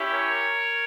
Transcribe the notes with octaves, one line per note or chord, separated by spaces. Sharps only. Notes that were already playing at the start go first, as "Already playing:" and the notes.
Already playing: C#4 E4 G4
A#4 C#5